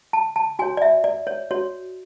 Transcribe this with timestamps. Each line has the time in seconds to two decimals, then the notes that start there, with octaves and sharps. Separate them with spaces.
0.13 A5
0.36 A5
0.59 F#4 C#5 G#5
0.77 D5
0.82 E5
1.04 D5
1.27 C#5
1.51 F#4 C#5